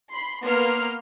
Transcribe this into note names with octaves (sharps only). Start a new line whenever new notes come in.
B5 C6
A#3 B3 C6 F6